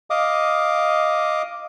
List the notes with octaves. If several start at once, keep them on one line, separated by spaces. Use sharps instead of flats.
D#5 F5 D6 D#6